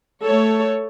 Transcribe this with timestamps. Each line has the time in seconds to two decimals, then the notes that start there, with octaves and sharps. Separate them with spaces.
0.25 A3 A4 C#5